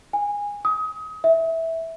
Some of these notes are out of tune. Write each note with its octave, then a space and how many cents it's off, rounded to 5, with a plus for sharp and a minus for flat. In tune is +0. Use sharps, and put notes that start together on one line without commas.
G#5 -20
D#6 +30
E5 -10